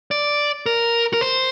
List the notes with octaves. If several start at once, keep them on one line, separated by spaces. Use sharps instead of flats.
D5
A#4
A#4
C5